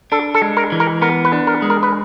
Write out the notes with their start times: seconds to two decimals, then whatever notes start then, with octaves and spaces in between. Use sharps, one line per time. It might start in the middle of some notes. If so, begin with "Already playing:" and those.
0.12 D4 A4
0.34 A4
0.42 G#3
0.57 A#4
0.72 E3
0.80 A#4
1.02 B3 A#4
1.25 B4
1.33 D4
1.47 A#4
1.62 G#3
1.70 A#4
1.83 B4